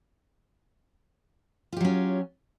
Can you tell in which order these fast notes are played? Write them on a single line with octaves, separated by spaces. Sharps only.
F4 G4 F#3 C#4